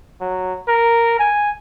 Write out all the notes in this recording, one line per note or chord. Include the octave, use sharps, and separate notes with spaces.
F#3
A#4
G#5